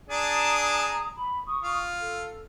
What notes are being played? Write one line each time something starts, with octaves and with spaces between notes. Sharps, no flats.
D4 G#4 A5 A#5 D#6
B5
C#6 D#6
F4
A4